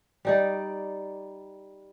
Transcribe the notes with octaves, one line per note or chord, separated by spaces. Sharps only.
G3 D#4 D5